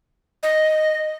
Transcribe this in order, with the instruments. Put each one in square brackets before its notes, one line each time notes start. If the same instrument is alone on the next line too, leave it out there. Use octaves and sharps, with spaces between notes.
[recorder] D#5